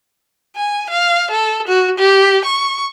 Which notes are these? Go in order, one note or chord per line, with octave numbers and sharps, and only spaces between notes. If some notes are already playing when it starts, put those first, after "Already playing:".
G#5
F5
A4
F#4
G4
C#6